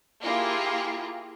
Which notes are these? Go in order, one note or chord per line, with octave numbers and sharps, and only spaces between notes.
A#3 E4 F4 G4 G#4